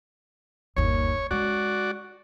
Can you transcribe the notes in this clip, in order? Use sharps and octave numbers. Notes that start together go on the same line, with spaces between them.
G1 D#2 C#5
G#3 C#4 F#4 D5